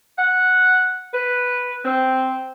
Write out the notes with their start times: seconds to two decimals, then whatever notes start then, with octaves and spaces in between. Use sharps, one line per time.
0.17 F#5
1.13 B4
1.84 C4